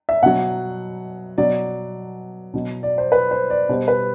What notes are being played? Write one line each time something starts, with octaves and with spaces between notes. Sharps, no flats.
E5
B2 F#3 F#5
B2 F#3 D5
B2 F#3
D5
C5
B4
C5
D5
B2 G3 C5
B4